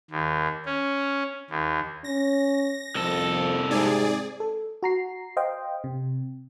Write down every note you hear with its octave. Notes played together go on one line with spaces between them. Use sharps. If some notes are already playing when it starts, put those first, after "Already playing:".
D#2
C#4
D#2
C#4 A#6
C2 F2 A4
G#2 C3 G#4 D5
A4
F#4 A#5 C7
C5 D#5 F5 G5
C3